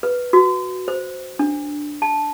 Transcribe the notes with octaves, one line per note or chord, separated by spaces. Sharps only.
B4
F#4
C5
D4
A5